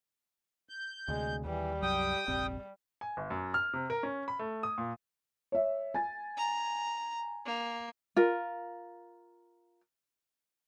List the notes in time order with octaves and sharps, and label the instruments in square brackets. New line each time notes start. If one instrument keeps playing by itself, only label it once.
[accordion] G6
[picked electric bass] D2 C3 [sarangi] G#3
[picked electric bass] D#2 [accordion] E3 [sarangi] G3
[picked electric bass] C2 F#2 F#3 [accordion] G5 D#6
[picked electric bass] F1 A#1 C4 [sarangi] G3
[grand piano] G#5
G1
F#2
F6
C3
A#4
C#4
B5
A3
D#6
A#2
[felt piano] C#5 E5
G#5 A6
[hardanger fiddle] A#5
A#3
[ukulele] F4 A#4